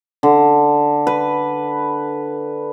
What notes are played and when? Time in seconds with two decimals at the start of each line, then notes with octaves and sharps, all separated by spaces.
0.23 D3
1.07 B4